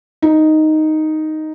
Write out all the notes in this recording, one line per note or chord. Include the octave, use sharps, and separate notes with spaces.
D#4